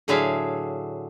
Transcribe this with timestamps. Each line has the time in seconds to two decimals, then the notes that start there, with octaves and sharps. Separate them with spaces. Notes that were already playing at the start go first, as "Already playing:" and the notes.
0.08 A2 D3 F#3 G#4 E5 F5